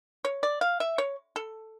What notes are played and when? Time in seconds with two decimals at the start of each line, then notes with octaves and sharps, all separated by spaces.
0.25 C#5
0.43 D5
0.61 F5
0.80 E5
0.98 C#5
1.36 A4